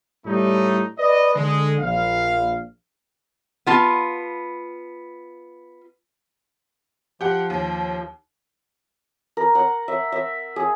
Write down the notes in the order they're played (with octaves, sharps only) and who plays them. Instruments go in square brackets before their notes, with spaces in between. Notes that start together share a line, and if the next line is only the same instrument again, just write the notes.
[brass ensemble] A2 G3 A3 D4 D#4
B4 D5 D#5
D3 G#3
A#1 F5
[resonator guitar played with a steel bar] B3 F4 A5
[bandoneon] F3 [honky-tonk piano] G4 F#5
[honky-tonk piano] D#2
[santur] A#4
F#5
E5
E5
G#4